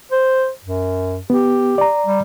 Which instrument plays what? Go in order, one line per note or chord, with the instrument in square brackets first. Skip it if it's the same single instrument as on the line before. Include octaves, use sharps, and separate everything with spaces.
[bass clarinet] C5
F#2
[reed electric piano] B3 [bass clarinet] G4
[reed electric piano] D5 A#5
[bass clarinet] G3